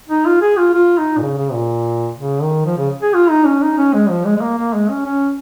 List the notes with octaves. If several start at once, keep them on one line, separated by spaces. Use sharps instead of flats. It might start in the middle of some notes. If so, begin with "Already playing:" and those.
D#4
F4
G#4
F4
F4
D#4
A#2
C#3
C#3
A#2
C#3
D#3
F3
C#3
G#4
F4
D#4
C#4
D#4
C#4
G#3
F3
G#3
G#3
A#3
A#3
G#3
C#4
C#4